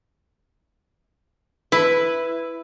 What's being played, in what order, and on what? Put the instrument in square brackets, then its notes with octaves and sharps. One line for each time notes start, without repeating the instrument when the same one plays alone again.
[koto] E4 [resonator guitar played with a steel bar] B4